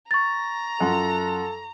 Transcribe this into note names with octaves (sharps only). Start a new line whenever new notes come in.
A#5 C#6 A6
F#2 F4 A4 F#5